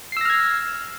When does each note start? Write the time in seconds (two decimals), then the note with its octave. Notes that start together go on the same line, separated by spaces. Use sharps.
0.12 C7
0.17 E6
0.21 A#6
0.25 F6
0.30 G#6